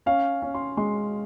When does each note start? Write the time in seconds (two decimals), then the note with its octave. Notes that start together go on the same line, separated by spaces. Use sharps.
0.06 C#4 F5
0.42 C#4
0.55 C6
0.77 G#3 C6